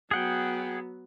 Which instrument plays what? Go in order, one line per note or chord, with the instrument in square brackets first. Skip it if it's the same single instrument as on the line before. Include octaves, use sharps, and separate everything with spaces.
[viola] F#3 B3 [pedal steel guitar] G#4 F#5 G5